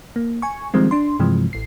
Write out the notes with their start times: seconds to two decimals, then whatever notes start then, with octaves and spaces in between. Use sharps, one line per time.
0.16 A#3
0.42 G#5 C#6
0.74 D#3 F3 G3 G#3 C4
0.91 D4 C6
1.19 G2 C3 E3 F3 G#3
1.53 A1 C7